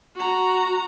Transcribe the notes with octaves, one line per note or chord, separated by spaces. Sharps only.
F#4 A#5